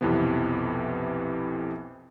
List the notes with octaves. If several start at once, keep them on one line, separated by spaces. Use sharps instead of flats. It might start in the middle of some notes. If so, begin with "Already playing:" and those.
B1 F2 C3 E3 F3 B3